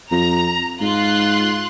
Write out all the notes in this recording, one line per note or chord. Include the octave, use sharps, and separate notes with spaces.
F2 A#5
G#2 F4 C6 F#6